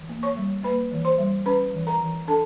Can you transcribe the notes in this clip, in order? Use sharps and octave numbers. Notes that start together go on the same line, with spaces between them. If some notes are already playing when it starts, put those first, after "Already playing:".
Already playing: E3
A#3
C#5 C#6
G3
A#3 B4 B5
E3
C5 C6
G3
C#4 B4 B5
E3
A#4 A#5
E3
D4 A4 A5